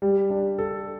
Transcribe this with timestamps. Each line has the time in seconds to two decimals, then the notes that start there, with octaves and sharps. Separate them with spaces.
0.02 G3
0.30 D4
0.58 A4